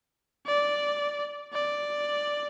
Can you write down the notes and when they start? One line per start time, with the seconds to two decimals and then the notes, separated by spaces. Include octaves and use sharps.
0.47 D5
1.54 D5